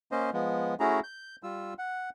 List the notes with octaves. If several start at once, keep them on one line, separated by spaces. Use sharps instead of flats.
A#3 C#4 C5 D#5
F3 G#3 B3
A3 C#4 E4 F#4 G#4 A#5
G6
G3 F4 E6
F#5